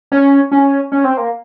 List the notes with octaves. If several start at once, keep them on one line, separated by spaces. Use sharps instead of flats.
C#4
C#4
C#4
C4
A#3